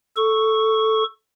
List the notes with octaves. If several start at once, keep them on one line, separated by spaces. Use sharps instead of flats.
A4 C#6